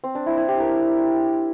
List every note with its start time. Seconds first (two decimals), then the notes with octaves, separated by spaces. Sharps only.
0.04 C4
0.15 D4
0.26 E4
0.37 E4
0.48 G4
0.60 A#4